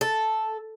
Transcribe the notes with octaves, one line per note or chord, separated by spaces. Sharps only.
A4